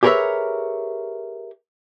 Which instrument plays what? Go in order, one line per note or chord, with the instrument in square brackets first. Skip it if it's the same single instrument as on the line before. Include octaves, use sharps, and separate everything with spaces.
[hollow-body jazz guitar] G4 G#4 A#4 B4 C#5 E5